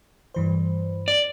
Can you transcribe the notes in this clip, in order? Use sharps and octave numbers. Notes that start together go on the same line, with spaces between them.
G2 E3 C5
D5